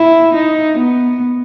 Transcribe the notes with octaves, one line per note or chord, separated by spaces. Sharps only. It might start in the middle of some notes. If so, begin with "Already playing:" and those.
Already playing: E4
D#4
B3